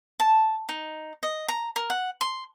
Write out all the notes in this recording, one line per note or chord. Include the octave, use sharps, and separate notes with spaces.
A5
D#4
D#5
A#5
A#4
F#5
C6